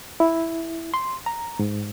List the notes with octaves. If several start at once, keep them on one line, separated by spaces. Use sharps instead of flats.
E4
C6
A#5
G#2